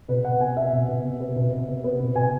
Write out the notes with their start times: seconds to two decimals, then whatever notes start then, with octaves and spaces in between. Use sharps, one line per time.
0.08 B2 B4
0.24 B2 F#5
0.41 B3 G#5
0.57 B3 E5
0.73 B2
0.88 B2
1.04 B3
1.20 B3
1.36 B2
1.52 B2
1.68 B3
1.84 B3
2.00 B2
2.15 B2 G#5